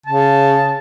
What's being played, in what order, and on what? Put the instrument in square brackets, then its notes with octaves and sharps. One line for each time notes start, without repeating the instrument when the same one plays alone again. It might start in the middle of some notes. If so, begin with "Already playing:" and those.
[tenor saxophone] C#3 [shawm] A5